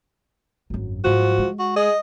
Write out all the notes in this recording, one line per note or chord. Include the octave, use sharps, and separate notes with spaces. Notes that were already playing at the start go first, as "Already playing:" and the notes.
G#1 F#2
G#2 F3 F#3 F#4
G#3
F#4
G#4 D#5